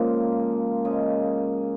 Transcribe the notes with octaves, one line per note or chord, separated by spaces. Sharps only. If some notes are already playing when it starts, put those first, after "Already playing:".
Already playing: C#3 F3 G#3 A#3
C#3 G#3